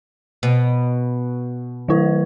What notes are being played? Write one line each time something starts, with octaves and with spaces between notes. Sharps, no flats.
B2
D#3 F#3 A3 E4 B4